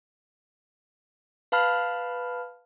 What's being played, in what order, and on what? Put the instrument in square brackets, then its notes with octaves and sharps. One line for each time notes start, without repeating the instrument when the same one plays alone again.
[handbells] B4 F5 A5 B5 F6